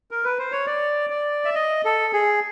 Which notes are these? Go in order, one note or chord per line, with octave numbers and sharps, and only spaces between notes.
A#4
B4
C5
C#5
D5
D5
E5
D#5
A4
G#4